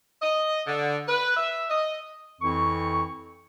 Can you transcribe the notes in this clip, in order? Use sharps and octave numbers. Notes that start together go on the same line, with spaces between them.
D#5
D3
B4
E5
D#5
F2 E3 C4 E4 C#6